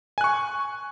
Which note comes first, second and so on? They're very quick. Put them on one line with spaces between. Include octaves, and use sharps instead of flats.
G#5 F#6 C#6